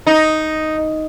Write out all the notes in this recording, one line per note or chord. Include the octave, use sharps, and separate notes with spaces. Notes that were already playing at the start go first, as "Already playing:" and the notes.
D#4